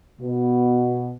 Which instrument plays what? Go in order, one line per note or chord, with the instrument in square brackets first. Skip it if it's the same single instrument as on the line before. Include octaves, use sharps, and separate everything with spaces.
[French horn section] B2